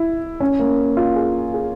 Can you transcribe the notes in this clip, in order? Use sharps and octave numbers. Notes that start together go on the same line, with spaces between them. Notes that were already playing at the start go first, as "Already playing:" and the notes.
Already playing: E4
C#4
A#3
F4
G#4
G#4